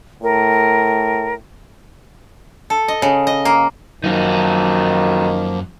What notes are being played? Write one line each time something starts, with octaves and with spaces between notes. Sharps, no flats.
A2 A#4
A4
D#5
C#3
D#5
A#3
F#2 D#3 F3 A#3 D#4 F#4